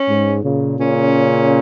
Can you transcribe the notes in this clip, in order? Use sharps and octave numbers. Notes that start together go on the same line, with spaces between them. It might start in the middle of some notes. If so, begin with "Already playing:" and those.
Already playing: C#4
G#2
A#2 C#3
A#2 C#3 C#4